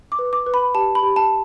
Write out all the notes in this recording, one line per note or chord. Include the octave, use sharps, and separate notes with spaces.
D6
B4
D6
B4
B5
G4 A5
B5
G4
A5